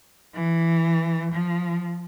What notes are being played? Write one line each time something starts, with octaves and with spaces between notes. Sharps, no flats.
E3
F3